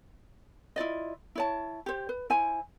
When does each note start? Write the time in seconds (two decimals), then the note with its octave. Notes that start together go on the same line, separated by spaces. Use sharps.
0.76 E4 F4 D5 D#5
1.35 E4 C#5 A5
1.86 G4 C5
2.09 B4
2.30 E4 C5 G#5